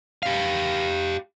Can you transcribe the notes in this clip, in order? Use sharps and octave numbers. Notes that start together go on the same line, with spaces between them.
G4 F5